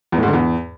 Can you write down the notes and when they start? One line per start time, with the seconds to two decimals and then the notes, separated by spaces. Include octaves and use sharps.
0.12 E2
0.18 A2
0.23 G#2
0.28 D3
0.33 E2